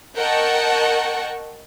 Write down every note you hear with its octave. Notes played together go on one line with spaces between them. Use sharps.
A#4 D#5 F#5 G5 A5 C#6